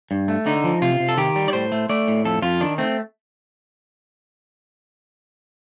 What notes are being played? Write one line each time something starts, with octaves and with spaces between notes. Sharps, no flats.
G2
A3
D3 D#4
F3
C3 F4
C3
A4
D#3 G4
G3
D5
A2 C5
A3
A3 D5
A2
F2 A4
F2 F4
D#3 D4
A3 C4